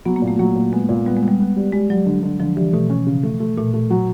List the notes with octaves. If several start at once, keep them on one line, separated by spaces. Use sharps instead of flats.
F#3 B3
A#3
A#2
A3
F#3 A#3
A#2
G#3 B3
A#2
G3 B3
G#3
B3
G3
B3
G3
G3 G#3
F#3 G3
D3
D3
D3 F3
E3 G3
B2 A3
C#4
C#3
A3
A3
A#2 A3
A3
F#3